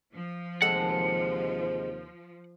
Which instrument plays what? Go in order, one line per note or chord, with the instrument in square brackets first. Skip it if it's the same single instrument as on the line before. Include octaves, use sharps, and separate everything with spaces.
[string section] F3
[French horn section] D#2 C3 C5 [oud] G#3 C4 A4 [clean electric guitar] F#5